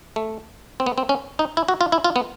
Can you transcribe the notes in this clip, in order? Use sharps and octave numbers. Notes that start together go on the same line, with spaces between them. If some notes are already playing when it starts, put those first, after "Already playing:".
A3
C4
B3
C4
C#4
D#4
E4
F#4
F4
E4
F4
B3